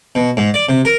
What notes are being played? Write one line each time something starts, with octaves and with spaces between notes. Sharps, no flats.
B2
G#2
D5
C3
A#4